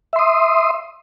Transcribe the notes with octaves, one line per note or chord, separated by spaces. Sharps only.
E5 C6 D#6